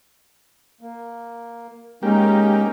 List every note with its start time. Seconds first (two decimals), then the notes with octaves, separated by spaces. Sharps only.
0.81 A#3
2.03 G#3 A#3 C#4 D#4 G4